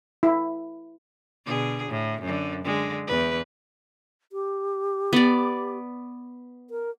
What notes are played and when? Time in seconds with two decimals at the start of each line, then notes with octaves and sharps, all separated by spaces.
0.23 E4
1.46 B2 D3 G#4
1.89 A2
2.22 F#2 D3
2.64 D3 G#3
3.07 E2 B4
4.32 G4
5.13 B3 D5
6.70 A#4